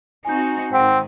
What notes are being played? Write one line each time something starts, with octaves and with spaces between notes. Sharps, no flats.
C4 D#4 F#4 G#5 G6
G#2 D#3 C4 F#5 G5 D7